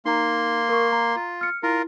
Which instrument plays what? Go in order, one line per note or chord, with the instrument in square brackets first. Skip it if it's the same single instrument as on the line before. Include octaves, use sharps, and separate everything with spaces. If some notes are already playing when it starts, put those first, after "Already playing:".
[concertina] A#3 C6 [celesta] D#4 A#5
[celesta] A#4 C#6
A#5
[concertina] F4
[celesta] F6 C#7
[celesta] E4 [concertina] F4 A#4